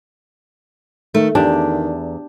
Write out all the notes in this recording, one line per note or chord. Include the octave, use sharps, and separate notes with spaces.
D#3 A3
E2 D#3 D4 G4